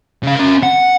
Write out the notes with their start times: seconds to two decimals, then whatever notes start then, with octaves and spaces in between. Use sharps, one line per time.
0.23 C#3 F5
0.36 C#4 A#4
0.63 F#5